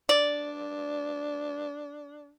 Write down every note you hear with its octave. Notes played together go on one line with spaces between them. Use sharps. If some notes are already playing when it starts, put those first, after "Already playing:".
D4 D5